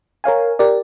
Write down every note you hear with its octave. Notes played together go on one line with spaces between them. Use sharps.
A#4 C#5 F5 G#5
G4 A#4 D5